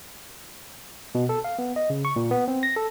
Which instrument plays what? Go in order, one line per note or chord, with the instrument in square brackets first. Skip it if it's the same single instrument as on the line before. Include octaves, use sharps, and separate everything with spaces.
[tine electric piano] B2
A4
F5
B3
D#5
C#3
C#6
A#2
B3
C4
A#6
A4